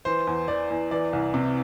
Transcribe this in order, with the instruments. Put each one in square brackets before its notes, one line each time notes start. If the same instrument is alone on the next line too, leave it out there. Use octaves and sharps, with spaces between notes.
[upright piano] E3 C5
E2
E3 D5
E2
E3 D5
C2
C3